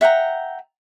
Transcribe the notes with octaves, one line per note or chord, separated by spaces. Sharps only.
E5 F#5 G5 A#5